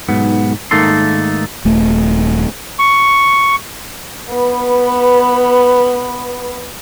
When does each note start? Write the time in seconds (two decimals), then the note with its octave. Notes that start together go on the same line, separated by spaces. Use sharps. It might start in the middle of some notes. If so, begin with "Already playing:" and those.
0.09 B1 G#2 B3
0.71 G#2 D#3 A3 A#3 A4 C6
1.65 D#1 A3
2.79 C#6
4.30 B3 B4